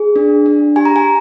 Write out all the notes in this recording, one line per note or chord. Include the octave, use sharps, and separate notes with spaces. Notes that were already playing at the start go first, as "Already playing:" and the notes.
Already playing: G#4
D4
D4
G4 G#5
A#5
G#5